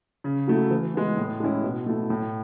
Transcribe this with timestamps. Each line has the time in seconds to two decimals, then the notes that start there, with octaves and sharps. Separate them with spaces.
0.24 C#3
0.47 F#3 A3 E4
0.71 E3
0.94 G#3 B3
1.17 A2
1.40 G#3 C#4 E4
1.63 B2
1.86 A3 E4
2.10 A2